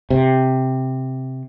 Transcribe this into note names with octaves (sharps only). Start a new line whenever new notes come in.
C3